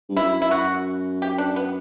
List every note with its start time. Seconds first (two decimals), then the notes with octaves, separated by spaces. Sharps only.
0.09 G2
0.17 F#2 E4
0.42 E4
0.51 F#4
1.22 G4
1.38 D4
1.56 B3